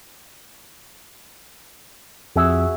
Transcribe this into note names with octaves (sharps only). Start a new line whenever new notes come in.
F2 F#4 G#4 E5